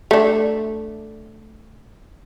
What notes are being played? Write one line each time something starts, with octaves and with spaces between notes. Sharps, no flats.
A3 D4